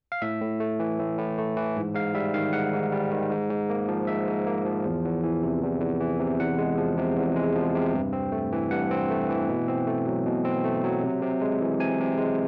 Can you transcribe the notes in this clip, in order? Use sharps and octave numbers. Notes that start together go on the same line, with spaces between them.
F5
A2 E5
A2
A3
E3
A2
A2
A3
E3
G#2
G#2 F5
G3 E5
D#3 F5
G#2 F#5
G#2
G3
D#3
G#2
G#2
A#3
F3
G#2 E5
G#2
A#3
F3
E2
E2
E3
C3
E2
E2
E3
C3
E2 F#5
G#3
F3
C3
E2
G#3
F3
C3
G2
C4
A3
E3
G2 F#5
C4
A3
E3
B2
C4
A3
F#3
B2
C4
A3
F#3
C3
C3
G#3
E3
C3 G#5
C3
G#3